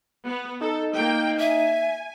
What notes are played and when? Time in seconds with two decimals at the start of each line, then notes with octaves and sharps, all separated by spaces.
0.25 B3
0.61 D#4 A4
0.94 A#3 G5
1.39 E5 G#5